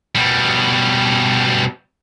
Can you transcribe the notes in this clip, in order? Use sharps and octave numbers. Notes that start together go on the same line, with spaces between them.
B2 G3